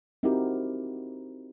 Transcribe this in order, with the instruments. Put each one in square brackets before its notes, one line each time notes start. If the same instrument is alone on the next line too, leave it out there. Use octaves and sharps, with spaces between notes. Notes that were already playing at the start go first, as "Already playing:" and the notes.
[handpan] C4 D#4 E4 F#4 G4 A#4